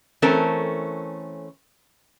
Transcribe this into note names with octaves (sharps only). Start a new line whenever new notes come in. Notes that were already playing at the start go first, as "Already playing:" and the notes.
E3 A3 C4 C#4 A4 A#4